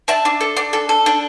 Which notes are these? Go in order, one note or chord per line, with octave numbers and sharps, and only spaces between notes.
D4 E5 A5
D4
A4
D4
A4
A4
D4